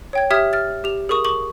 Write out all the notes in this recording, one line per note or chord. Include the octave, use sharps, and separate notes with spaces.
C#5 G5 G#6
G4 E5 D#6 F6 G#6 B6
F6 A6
G4 F7
G#4 A#4 C#6 D#6
C#6 D6 F#7